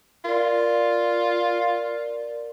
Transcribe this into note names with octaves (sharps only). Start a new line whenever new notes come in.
F4 A#4 D5